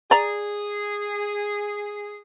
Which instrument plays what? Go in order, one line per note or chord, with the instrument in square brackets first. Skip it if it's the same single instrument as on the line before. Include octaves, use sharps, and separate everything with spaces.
[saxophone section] G#4 [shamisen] D5 A#5